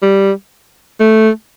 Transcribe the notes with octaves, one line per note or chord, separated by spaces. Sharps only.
G3
A3